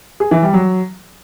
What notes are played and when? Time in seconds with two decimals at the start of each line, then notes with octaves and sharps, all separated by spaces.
0.20 G#4
0.31 E3
0.42 G3
0.53 F#3